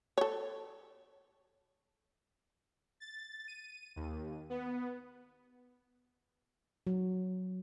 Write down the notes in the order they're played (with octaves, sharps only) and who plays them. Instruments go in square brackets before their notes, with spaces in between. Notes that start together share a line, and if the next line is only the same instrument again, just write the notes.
[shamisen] A4 C#5
[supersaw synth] A6
D#7
D#2
B3
[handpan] F#3